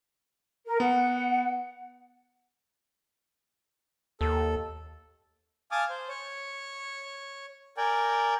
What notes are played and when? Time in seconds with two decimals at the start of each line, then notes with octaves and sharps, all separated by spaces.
0.66 A#4
0.80 B3 F#5
4.21 D#2 A4
5.71 F5 G#5 A5 D6 D#6 F6
5.89 C5
6.09 C#5
7.77 A#4 D5 G5 G#5